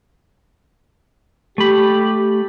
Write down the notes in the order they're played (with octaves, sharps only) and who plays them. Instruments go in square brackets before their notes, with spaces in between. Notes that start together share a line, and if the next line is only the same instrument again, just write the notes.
[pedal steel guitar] A3 B5 [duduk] G4